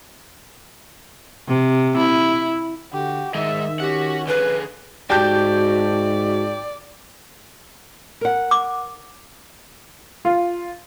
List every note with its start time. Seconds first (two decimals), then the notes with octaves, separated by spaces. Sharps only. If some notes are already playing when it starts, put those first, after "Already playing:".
1.48 C3
1.98 E4
2.93 D3 F#4 G4
3.35 D#3 G#3 D#4 E5
3.80 C#4 F#4 G4 F#5
4.27 D3 G#4 B4
5.10 G#2 F#4 G4 D5 A5 G6
8.21 A#4 F#5
8.51 D6
10.25 F4